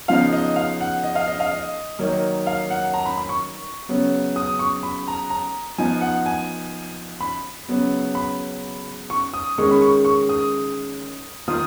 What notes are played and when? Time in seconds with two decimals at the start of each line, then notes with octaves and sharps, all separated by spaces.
0.08 C#3 F3 B3 D#4 F5
0.32 D#5
0.56 F5
0.81 F#5
1.03 D#5
1.15 F5
1.28 D#5
1.40 F5
1.51 D#5
1.99 D#3 F#3 A#3 D#4
2.47 F5
2.70 F#5
2.94 A#5
3.06 B5
3.17 B5
3.29 C#6
3.89 C#3 F#3 B3
4.36 D#6
4.59 C#6
4.83 B5
5.08 A#5
5.30 A#5
5.78 F3 B3 D#4 G#5
6.01 F#5
6.26 G#5
7.21 B5
7.69 C#3 F#3 B3
8.15 B5
9.10 C#6
9.34 D#6
9.58 D#3 G#3 C#4 C#6
9.71 B5
9.82 C#6
10.05 C#6
10.29 D#6
11.47 D#3 A#3 F4 D#6